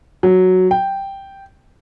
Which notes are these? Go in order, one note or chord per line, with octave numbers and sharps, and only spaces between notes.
F#3
G5